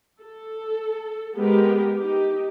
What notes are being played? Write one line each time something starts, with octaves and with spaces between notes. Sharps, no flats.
A4
G#3 B3 G4 A#4
D#4 G4